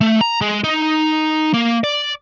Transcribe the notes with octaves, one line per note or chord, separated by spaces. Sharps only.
A3
A#5
G#3
D#4
A#3
D5